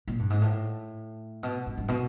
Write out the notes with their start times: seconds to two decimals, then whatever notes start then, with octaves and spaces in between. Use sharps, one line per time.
0.08 A#2
0.19 G2
0.30 G#2
0.42 A2
1.43 B2
1.66 G2
1.77 G2
1.88 B2